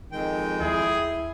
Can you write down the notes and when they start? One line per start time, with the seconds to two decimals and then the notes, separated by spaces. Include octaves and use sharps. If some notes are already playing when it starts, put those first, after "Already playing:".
0.12 F2 D#3 G#3 G5
0.61 D#2 E4 G#4